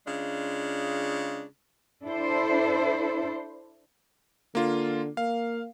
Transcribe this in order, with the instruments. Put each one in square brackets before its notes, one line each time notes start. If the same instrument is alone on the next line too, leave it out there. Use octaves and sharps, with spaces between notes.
[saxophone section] C#3 G#3 D4 F4
[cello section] D4 E4 A4 C5
[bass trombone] D3 [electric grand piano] A#3 F4
[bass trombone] A#3 [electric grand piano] F5